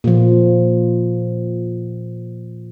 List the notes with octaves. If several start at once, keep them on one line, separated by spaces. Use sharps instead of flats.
A#2 F3